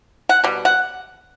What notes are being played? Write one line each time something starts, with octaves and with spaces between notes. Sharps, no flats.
F#5
B2 G3
F#5